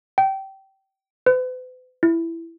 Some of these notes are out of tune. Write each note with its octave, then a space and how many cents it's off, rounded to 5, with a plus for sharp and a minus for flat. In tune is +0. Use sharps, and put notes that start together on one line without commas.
G5 -20
B4 +45
E4 +10